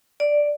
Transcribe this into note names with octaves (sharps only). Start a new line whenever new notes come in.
D5